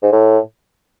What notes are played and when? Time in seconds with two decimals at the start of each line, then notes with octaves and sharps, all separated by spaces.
0.03 G#2
0.12 A2